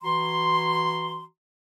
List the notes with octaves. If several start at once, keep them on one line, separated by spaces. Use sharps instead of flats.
E3 F#4 A#5 C6